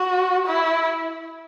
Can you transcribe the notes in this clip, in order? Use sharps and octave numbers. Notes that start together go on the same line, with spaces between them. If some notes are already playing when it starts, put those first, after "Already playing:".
Already playing: F#4
E4